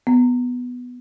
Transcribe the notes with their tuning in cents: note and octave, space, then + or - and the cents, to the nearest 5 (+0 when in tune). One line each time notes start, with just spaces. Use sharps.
B3 +0